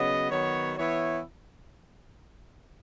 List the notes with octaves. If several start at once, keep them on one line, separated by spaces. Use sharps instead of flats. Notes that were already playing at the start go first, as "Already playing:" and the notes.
Already playing: C#3 F#3 B3 D#5
D#3 F#3 B3 C#5
E3 B3 E4 C#5